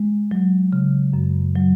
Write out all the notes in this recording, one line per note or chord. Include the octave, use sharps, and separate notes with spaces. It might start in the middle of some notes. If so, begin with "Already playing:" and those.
Already playing: G#3
F#3
C#3
F#2
F#3